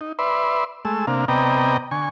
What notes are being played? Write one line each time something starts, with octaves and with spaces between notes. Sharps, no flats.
D#4
B4 D5 E5 C6
G#3 A3 E6
C3 A#3 D4 F5
C3 B3 D5 D#5 G5 A#5
D3 G#5 C#6